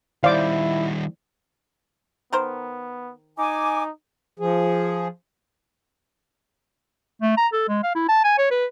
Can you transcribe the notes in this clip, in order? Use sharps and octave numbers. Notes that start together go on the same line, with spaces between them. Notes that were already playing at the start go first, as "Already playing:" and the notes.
D#3 G3 E4 C5 D5 F5 D6
D#3 B3 A#4 C5
D#4 G#5 D6
F3 G#4
A3
A#5
A4
G#3
F5
E4
A5
G#5
C#5
B4